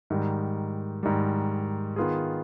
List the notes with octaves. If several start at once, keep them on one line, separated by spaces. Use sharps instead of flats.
G#2 D#3 G3
G#2 D#3 G3
D#3 B3 F4 G#4